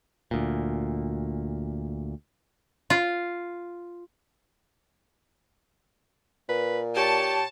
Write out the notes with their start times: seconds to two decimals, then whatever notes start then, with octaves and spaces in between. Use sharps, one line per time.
0.31 D2 A#2
2.90 F4
6.49 A#2 B4
6.96 G4 C#5 A5